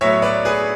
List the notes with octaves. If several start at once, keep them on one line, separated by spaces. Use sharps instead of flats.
A2 F#3 B3 C#5 E5
B4 D5
G#4 B4